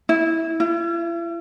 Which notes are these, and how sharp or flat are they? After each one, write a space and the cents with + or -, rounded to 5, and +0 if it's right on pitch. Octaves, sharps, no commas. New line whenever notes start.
E4 -15
E4 +45